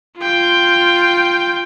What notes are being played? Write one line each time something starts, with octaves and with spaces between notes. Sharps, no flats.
F4 G5